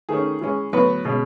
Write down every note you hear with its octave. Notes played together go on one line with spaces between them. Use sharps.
D#3 A3 C#4 G#4
E3 G#3 C#4
A2 F#3 B3 B4
B2 G#3 C#4